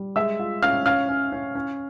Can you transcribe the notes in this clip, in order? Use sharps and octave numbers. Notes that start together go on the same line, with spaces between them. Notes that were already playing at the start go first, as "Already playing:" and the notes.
Already playing: G3
G#3 E5 E6
F4
C#4 F5 F6
C#4 F5 F6
C#4
C#4
C#4